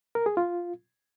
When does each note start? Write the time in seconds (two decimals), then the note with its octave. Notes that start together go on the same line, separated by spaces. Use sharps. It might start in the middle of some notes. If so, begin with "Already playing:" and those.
0.15 A#4
0.26 G#4
0.37 F4